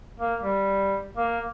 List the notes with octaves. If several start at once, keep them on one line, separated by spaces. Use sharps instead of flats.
A#3
G3
A#3